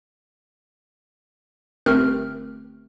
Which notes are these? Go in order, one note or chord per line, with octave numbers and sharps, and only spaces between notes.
G1 A3 C4 G4 A#4 F6